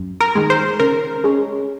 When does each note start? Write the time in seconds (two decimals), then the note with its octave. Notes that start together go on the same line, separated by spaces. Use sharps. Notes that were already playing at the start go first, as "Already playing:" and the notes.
Already playing: F#2
0.21 A#4
0.35 D#3 G#3
0.50 C5
0.79 C#3 A#4
1.24 G#3 C#4